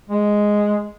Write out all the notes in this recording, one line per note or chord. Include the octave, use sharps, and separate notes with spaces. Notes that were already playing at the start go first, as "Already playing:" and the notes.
G#3